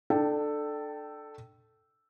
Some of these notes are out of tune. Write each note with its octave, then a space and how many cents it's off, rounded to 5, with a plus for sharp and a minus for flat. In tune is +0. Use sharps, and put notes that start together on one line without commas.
D4 +25 A4 +0 G5 -15